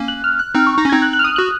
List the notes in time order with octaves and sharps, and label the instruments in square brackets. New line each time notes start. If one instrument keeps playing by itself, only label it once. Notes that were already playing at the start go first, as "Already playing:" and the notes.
Already playing: [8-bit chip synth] A#3 C#4
[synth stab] F#6
F6
F#6
[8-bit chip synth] C4 D#4 [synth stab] F6
[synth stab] C#6
[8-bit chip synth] D#4 [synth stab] A#6
[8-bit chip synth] C#4
[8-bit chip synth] C4 D#4 [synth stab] G#6
[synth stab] F#6
F#6
F6
D#6
[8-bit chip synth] F#4 [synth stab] F#6